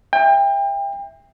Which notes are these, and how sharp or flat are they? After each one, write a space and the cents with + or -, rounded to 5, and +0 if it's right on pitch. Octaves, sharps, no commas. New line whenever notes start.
E5 +0 G5 +30